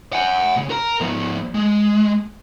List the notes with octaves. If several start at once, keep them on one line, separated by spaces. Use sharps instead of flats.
F#5 G#5
A#2 C#3
A#4 A#5
F3 B3
G#3